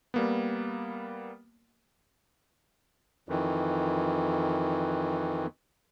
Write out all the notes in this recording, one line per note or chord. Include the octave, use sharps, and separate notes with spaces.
G3 A#3 B3
F2 D#3 E3